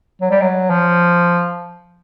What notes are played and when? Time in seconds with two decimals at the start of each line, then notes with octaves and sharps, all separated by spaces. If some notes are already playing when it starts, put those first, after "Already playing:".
0.21 F#3
0.31 G3
0.42 F#3
0.70 F3